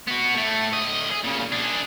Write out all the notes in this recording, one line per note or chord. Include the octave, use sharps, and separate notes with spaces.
B3 F#4
A2 A3
D3 D#5
G#4
A#2 C#3
D4 G#4